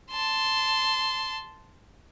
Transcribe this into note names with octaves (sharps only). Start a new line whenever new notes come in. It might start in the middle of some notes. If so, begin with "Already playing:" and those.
A5 C6